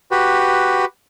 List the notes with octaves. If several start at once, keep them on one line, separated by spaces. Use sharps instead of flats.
F#4 G4 B4